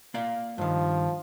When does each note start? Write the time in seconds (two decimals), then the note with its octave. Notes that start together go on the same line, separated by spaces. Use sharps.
0.14 A#3 D5 F5
0.58 G2 D#3 F3